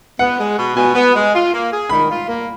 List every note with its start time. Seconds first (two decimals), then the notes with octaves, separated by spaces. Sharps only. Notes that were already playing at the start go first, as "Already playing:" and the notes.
0.19 B3 F#5
0.38 G#3
0.57 B2
0.76 B2 G#5
0.95 B3
1.15 G#3
1.33 F4
1.53 A#3
1.71 G#4
1.89 D#3 B5
2.09 F4
2.28 A#3